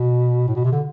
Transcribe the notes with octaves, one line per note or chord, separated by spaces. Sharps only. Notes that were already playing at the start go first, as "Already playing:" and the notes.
Already playing: B2
A2
B2
C3
D3